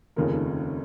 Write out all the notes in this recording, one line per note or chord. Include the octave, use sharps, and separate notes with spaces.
F1 D#2 C#3 F3 A#4